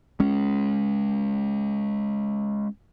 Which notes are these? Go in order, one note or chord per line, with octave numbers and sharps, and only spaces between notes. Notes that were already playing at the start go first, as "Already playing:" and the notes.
G#3 C#4